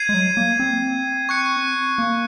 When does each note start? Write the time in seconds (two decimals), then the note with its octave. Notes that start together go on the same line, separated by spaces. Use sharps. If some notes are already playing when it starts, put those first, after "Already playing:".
Already playing: G#6 C7 D#7
0.09 G#3
0.14 F#3
0.37 A#3
0.60 C4
1.29 C#6 F#6 C#7
1.98 A#3